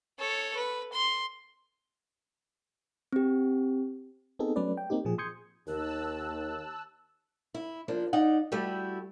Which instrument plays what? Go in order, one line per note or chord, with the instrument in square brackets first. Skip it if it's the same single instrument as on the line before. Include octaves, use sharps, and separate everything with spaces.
[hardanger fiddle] A4 C#5
B4
C6
[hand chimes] C4 G4
[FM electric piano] B3 C4 D#4 G#4 A4
F#3 A3 C#4 B4 D5
G5
A#3 C4 D#4 G4
A#2 F3 G#4
C6 D#6 G6 G#6 C#7
[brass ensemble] D#2 [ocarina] A#4 [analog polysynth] A5 E6 F#6
[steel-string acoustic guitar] E4
F3 A#3 D4
D#4 D5 F#5
G3 A3 E4 F#4 G4